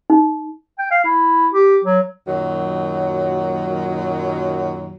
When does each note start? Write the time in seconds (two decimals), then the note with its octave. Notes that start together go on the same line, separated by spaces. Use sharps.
0.10 D#4
0.79 G5
0.91 F5
1.04 E4
1.53 G4
1.84 F#3
2.26 F#2 A#2 D#3 F#3